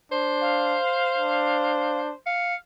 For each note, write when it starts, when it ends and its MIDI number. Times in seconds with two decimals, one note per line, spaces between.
0.12 0.78 62
0.12 2.15 72
0.41 2.01 77
1.16 2.13 62
2.26 2.55 77
2.26 2.55 97